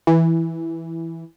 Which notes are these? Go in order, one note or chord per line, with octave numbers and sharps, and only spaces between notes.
E3